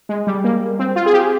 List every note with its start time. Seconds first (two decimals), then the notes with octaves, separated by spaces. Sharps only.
0.09 G#3
0.27 G3
0.44 A#3
0.79 C4
0.96 F4
1.06 G#4
1.13 G4